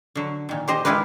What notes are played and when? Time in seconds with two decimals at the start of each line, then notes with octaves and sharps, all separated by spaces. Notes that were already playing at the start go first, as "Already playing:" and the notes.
0.15 D3 F#3
0.49 A#2 D#3
0.68 G4 C5 D#5
0.85 D#3 G#3 E4 F4 G4 B4